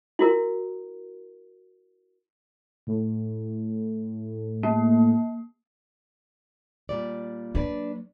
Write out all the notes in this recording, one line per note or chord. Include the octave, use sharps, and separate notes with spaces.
E4 F#4 A#4
A2
A#3
A#2 G3 D5
F#3 A#3 D4 B4 D5